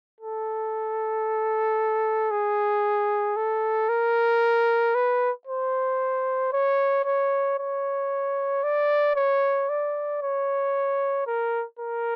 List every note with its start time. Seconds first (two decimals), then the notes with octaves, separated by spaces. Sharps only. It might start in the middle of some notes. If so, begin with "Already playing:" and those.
0.21 A4
2.31 G#4
3.36 A4
3.89 A#4
4.95 B4
5.47 C5
6.53 C#5
7.05 C#5
7.58 C#5
8.63 D5
9.16 C#5
9.69 D5
10.22 C#5
11.27 A#4
11.79 A#4